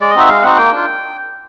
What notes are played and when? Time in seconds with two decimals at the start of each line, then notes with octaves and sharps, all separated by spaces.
0.01 G#3 D5
0.10 D#5
0.15 C4 D#4 F#4 E5
0.29 G#3 F5
0.43 C4 D#4 F#4 F#5
0.57 A#3 G5
0.72 D4 F4